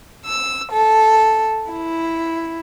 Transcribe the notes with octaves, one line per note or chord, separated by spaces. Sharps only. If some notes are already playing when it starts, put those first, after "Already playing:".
E6
A4
E4